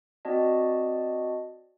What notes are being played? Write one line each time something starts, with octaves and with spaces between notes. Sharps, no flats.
C4 F#4 D5 D#5 A5